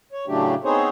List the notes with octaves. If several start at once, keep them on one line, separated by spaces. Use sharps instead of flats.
C#5
A2 C#3 F#3 A3 D4 G4
B3 C4 D#4 G#4 C5 C#5